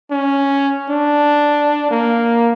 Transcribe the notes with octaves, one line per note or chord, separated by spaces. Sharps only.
C#4
D4
A#3